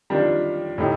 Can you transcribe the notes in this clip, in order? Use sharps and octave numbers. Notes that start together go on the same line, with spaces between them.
D#3 G3 D4 F4
A2 A3 D#4 G4